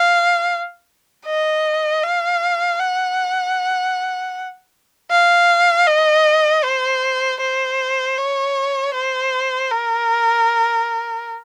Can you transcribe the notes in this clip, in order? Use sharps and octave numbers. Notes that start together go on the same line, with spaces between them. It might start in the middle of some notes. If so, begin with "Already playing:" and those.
Already playing: F5
D#5
F5
F#5
F5
D#5
C5
C5
C#5
C5
A#4